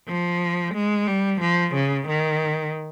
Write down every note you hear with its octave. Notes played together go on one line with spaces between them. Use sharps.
F3
G#3
G3
F3
C#3
D#3